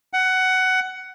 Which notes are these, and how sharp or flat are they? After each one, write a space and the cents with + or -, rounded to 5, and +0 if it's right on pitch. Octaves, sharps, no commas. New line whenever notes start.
F#5 +15